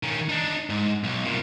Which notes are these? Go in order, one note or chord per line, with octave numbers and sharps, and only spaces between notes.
D#3 C#4
D4 D#4
G#2
B1
C2 A#2